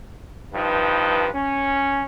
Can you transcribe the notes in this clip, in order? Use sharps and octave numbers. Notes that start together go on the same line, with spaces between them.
G2 F3 D#4 B4
C#4